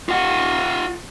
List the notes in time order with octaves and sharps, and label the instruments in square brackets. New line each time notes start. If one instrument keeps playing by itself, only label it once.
[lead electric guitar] F4 F#5